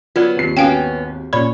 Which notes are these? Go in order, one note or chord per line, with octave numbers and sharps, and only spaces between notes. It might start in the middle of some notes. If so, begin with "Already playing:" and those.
F#3 B3 F4 B4 D5
G#1 D#2 C7
B3 C#4 F#4 F5 G5
A#2 C#4 C#5 D5 B5